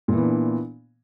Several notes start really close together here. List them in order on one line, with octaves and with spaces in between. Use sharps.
A#2 E3 B3 D4